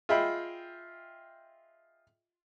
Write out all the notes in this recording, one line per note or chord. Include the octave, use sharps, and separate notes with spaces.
F4 G#4 D#5 E5 G5 B5